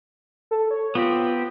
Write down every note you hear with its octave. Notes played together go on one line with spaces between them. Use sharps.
A4
C#5
B3 C4 F4 G4